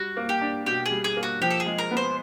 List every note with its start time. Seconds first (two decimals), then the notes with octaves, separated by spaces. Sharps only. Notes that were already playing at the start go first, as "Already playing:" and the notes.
Already playing: G3 F#4
0.16 A#3
0.29 G4
0.41 D4
0.66 B2 G4
0.86 G#4
0.91 G3
1.04 G#4
1.16 A#3
1.23 F#4
1.41 F3 G4
1.50 A4
1.60 G#4
1.66 G#3
1.78 A#4
1.91 B3
1.97 C5